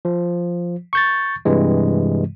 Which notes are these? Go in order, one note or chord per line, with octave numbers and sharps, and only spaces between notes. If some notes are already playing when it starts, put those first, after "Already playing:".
F3
C#6 G6 A6
G2 C3 E3 G#3